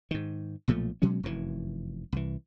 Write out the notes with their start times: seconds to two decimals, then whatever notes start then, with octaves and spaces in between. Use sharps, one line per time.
0.11 G#2 D#3
0.68 B1 A#2 F3 A3
1.02 B2 F#3 G#3 C#4
1.23 F1 F#2 A#2 E3
2.12 C2 E3